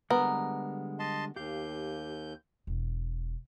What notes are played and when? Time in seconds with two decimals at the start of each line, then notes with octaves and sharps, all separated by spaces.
0.10 D3 G3 G#3 B3 A#4
0.99 D#5 A5 C6
1.36 D#2 G4 F5 G6
2.67 E1